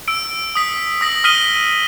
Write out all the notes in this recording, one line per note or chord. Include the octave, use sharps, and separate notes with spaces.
E6 D7
D#6 B6
D#6 A#6 B6 F#7
D#6 F6 B6 D#7 G7